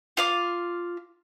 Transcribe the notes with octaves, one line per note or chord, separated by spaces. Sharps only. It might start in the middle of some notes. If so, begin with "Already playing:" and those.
F4 F5 D6